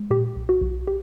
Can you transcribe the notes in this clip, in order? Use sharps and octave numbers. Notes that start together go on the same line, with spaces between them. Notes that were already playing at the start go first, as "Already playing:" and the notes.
Already playing: G#3
A#2 G4
B1
F#4
B1
G4